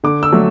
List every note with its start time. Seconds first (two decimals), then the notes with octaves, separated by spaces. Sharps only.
0.04 D3 D6
0.23 E6
0.32 F#3 A3